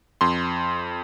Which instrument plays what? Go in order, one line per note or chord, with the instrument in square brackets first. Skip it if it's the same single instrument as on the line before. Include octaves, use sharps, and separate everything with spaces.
[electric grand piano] F2 C6